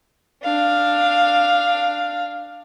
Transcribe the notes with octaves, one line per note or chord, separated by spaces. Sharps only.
D4 F5